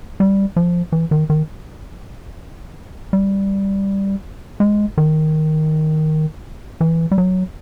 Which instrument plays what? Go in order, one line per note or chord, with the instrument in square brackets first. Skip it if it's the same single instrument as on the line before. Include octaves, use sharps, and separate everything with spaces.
[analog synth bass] G3
F3
E3
D#3
D#3
G3
G#3
D#3
E3
G3
F#3